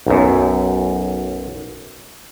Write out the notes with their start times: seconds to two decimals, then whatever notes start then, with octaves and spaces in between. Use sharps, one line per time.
0.07 B1 F#2